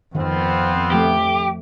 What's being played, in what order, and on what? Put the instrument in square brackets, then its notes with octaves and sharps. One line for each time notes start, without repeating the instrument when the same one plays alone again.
[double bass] F2 [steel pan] D#3 [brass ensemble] B3 C4 F4
[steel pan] F3 A3 [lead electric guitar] G4